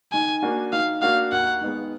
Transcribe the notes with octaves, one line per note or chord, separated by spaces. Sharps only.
D#3 G#5
A#3 D4 F#4
D#3 F5
A#3 D4 F#4 F5
D#2 F#5
D#3 G#3 B3